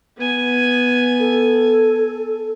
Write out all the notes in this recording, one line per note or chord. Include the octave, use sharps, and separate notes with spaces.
B3 G#5
A4